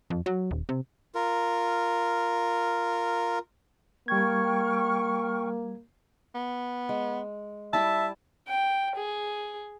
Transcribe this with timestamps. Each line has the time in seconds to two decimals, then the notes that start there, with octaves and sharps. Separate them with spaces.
0.10 F2
0.26 F#3
0.51 D#1
0.69 C3
1.15 F4 A#4
4.08 G3 A#3 G5 C#6 F6 G#6
6.35 B3
6.89 G#3
7.73 G3 E4 G4 E5 A5
8.48 G5
8.96 G#4